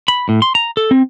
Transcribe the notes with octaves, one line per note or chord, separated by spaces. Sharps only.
B5
A2
C6
A#5
A4
C4